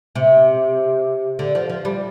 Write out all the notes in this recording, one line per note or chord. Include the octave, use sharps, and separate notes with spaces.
C3
D3
F3
F3
G3